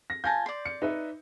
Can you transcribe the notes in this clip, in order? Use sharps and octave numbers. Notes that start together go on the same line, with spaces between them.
A#6
F4 G#5 A5 G6 A#6
D5 C6
C#7
D#4 B4 E5